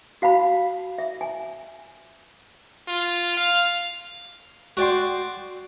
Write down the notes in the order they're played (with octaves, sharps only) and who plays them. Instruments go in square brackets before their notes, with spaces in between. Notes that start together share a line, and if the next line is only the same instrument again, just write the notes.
[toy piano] F#4 F5 A5 B5
E5
G#5
[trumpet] F4
F5
[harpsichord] F#4 D5 G5 C6